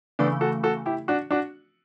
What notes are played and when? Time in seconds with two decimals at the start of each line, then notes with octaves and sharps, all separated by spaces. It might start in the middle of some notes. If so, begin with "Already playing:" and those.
0.19 C#3 E3 A3 B3 D4
0.41 F#4 A4
0.63 F#4 A4
0.86 E4 G4
1.08 D4 F#4
1.31 D4 F#4